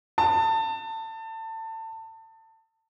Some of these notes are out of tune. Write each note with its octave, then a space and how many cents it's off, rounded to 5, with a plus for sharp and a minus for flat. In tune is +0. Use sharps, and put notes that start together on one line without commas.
A5 +25